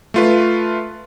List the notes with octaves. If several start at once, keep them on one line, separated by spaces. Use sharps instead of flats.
A3 F4 B4